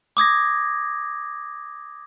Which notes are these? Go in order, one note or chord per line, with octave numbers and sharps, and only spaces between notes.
D6 D#6 G#6 A#6